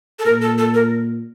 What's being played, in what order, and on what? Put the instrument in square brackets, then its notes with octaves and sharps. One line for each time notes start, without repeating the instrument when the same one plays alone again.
[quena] A4
[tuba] A#2 [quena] A#4
[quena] A4
A4
A#4